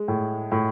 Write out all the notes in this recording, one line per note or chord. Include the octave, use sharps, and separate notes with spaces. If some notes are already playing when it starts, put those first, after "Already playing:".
Already playing: G#3
A2
A2